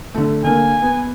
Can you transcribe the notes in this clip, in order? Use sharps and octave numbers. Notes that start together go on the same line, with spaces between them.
D3 A3
D3 A#3 G#5
B3